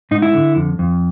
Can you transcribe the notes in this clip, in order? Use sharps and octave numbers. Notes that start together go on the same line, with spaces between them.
G#2 D#4
E4
D3
F2
F2